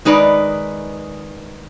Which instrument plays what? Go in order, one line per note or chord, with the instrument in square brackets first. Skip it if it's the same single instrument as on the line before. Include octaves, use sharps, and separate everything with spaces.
[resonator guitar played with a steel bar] D#3 G#3 D#4 B4 D5